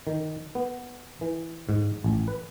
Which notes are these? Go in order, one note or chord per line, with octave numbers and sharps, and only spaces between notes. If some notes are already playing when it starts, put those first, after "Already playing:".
D#3
B3
E3
G#2
A1
B4